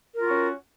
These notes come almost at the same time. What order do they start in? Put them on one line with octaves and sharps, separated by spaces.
A#4 F4 F#4 C#4